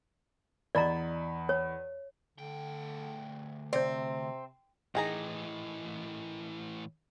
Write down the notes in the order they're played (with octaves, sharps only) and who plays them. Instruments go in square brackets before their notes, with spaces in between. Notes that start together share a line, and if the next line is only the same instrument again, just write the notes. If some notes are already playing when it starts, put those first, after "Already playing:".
[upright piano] E2 B5 [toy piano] D5 D#5 A#5
[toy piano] C#5
[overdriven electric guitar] D2 G5 [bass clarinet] D3
[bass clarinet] C3 [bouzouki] C4 [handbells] C5 D5
[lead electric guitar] A2 E3 [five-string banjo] D#3 G#4 A#5